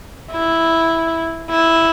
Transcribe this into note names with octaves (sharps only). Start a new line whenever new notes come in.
E4
E4